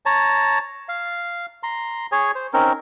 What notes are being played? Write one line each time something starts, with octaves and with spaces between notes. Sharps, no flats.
C#5 A5 A#5
F5
A#5 C6
G#4 C#5 G#5
C5
C4 C#4 D#4 A#4